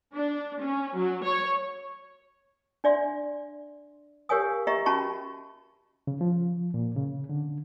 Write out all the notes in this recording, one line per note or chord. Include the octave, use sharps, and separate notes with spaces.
D4
C#4
F#3
C#5
D4 D5 E5 C6
G4 A#4 C#5 F5 G#5 D#6
G4 D#5 E5 A#5 C#6
C#4 F#4 A5 B5 C#6
C#3
F3
A#2
C#3
D3